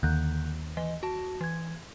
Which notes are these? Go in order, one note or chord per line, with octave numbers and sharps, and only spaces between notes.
D#2 D3 F#6 G6
E3 D#5
F#4 A5
E3 G#6